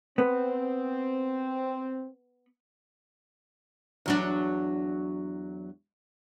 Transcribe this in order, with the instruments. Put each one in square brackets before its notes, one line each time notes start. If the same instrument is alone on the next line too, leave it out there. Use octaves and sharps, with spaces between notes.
[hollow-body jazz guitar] B3 [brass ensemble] C4
[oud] E2 F#3 D4